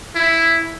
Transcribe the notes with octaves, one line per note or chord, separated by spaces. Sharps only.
E4